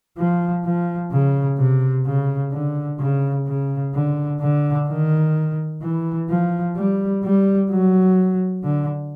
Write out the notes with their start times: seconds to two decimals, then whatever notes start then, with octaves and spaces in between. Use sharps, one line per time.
0.18 F3
0.64 F3
1.11 C#3
1.58 C3
2.06 C#3
2.52 D3
2.99 C#3
3.47 C#3
3.94 D3
4.41 D3
4.88 D#3
5.82 E3
6.29 F3
6.76 G3
7.24 G3
7.70 F#3
8.64 D3